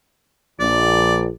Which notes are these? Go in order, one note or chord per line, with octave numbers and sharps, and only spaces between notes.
A#1 D5